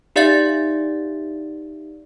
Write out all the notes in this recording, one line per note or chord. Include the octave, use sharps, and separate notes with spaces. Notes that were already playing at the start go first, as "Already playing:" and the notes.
D#4 G4 D5 E5 F5 A6